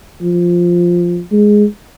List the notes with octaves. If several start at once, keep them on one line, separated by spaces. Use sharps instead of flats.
F3
G#3